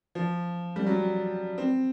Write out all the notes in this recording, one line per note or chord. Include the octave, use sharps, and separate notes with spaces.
F3
G3
F#3
C4